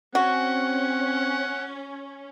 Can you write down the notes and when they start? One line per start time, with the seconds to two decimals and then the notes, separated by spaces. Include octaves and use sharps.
0.15 C4 C#4 F#4 F#5